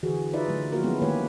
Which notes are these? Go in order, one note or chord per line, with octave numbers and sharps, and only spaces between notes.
D3 E3 F#4 G#4
D#4 F4 B4 D5 E5
D3 F#3 A3
F3 A#3 F4 F#4 A#4
F#3 G#3 B3 C#4 E4 G4
D#3 A3 A#3 G4 B4 C#5